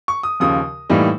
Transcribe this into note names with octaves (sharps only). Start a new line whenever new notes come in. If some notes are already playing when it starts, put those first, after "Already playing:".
C#6
D#6
D#2 C#3 F3 D#6
A2 E3 G3 A#3 D#4